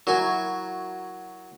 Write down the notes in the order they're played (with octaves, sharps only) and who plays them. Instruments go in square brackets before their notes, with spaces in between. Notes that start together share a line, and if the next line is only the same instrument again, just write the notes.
[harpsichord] F#3 G#5 [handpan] E4 F#4 A#4